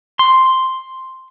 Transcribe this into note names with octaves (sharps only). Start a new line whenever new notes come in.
C6